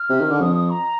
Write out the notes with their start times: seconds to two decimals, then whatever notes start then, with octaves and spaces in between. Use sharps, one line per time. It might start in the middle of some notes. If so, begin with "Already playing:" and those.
Already playing: F6
0.10 C3
0.20 D#3
0.31 D3
0.41 F2 D#6
0.55 D#6
0.70 A#5